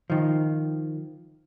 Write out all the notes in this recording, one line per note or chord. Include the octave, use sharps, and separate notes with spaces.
D#3 F3